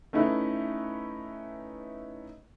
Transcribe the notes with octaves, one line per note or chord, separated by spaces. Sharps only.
A3 C#4 D#4 E4 B4